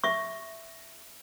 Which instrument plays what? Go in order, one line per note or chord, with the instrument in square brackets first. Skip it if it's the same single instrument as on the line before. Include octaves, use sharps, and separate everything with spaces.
[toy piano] E5 C#6